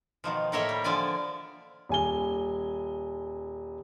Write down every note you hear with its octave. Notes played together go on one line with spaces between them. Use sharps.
B2 D#3 F3
A2 A#3 A#4 C#5 E5
G3
D3 F3 D5 G#5
D#1 G#5 G7